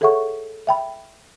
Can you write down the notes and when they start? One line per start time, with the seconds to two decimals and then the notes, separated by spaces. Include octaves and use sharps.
0.01 G#4 A4 C#5 E5 F#5 C#6
0.67 E5 G5 B5